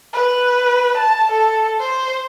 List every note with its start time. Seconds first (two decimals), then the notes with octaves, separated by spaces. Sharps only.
0.13 B4
0.97 A5
1.32 A4
1.80 C5